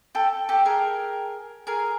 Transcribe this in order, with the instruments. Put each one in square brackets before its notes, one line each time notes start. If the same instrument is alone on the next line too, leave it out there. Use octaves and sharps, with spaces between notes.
[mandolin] G4 A4
G4 A4
G#4 A#4
G#4 A#4